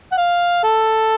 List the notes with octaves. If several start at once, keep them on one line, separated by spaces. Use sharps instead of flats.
F#5
F5
A4